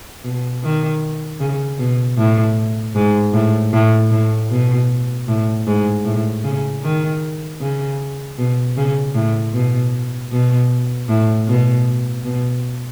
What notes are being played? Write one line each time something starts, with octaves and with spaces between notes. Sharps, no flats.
B2
D#3
C#3
B2
A2
G#2
A2
A2
A2
B2
A2
G#2
A2
C#3
D#3
C#3
B2
C#3
A2
B2
B2
A2
B2
B2